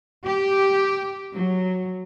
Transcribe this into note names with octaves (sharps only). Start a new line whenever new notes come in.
G4
F#3